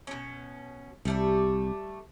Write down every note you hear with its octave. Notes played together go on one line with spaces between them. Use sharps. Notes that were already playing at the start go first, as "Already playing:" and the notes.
B2 C#4
C2 G3 A3 D5